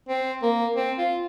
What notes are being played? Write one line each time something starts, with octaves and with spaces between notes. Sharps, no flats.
C4
A#3
C4
F4